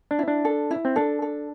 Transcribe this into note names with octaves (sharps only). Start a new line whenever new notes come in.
D4
E4
D4
A4
E4
C4
D4 A4
A4